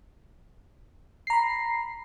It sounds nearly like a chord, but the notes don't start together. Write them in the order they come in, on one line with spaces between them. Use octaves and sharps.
C7 A#5 B5